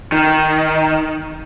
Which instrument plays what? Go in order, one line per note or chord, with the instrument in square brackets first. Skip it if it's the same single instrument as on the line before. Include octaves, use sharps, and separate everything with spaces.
[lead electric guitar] D#3